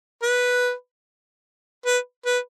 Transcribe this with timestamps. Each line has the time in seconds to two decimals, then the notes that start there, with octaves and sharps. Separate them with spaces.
0.23 B4
1.86 B4
2.26 B4